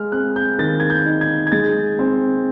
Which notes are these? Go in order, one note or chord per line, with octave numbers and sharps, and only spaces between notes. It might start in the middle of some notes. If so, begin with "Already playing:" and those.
Already playing: G#3 F6
C4 F#6
G6
D#3 A6
G#6
G6
D#4
G#6
G#6
G#3 A6
C4